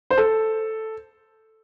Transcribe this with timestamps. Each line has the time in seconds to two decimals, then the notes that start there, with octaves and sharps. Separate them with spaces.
0.10 C5
0.18 A4